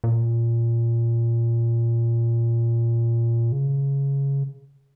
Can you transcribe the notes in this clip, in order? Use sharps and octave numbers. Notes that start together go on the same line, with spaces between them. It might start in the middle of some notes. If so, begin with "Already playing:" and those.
A#2
C#3